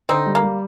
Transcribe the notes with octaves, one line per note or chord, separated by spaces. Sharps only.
D3 C4 D#4
G3
A#3
G3